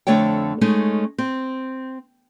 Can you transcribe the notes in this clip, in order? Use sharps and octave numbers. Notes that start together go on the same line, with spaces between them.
F2 D3 A3 C#5 D5 G5
G#3 A3 C#4 D#4
C4